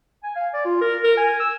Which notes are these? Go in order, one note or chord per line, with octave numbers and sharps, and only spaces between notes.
G#5
F5
D5
F4
A#4
A#4
G#5
E6